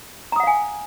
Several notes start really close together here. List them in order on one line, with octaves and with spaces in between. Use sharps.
A#5 D#6 F#5 F5 G#5